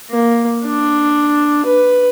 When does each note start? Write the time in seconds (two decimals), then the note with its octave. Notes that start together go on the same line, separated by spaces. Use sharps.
0.10 A#3
0.64 D4
1.65 B4